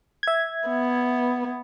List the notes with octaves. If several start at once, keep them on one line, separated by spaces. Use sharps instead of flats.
E5 G#6
B3